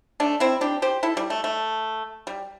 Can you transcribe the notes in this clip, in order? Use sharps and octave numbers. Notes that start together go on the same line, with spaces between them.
A3 D4
C4 E4
D4 G4
G4 C5
E4 A4
G3
A3
A3
G3